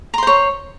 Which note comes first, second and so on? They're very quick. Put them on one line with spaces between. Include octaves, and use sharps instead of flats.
A#5 C6 C5 C#5